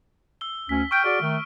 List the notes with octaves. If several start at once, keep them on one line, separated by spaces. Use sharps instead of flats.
E6 G7
D2 C#4 B6
G5 C#6 F6 D7
F#4 G#4 D5
D#3 A3